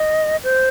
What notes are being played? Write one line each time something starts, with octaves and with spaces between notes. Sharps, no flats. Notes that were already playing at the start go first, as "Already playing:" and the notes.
Already playing: D#5
C5